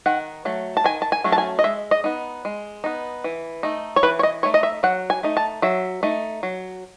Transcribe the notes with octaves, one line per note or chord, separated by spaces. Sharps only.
D#3 F#5
F#3 A3
A5
D#3 G#5
A5
G#5
F#3 A3 C#4
A5
G#5
D#5
G#3 E5
D#5
B3 D#4
G#3
B3 D#4
E3
A3 D#4
C#5
E3 B4
C#5
D#5
A3 D#4 C#5
D#5
E5
F#3 F#5
G#5
A3 D#4
A5
F#3 E5
A3 D#4
F#3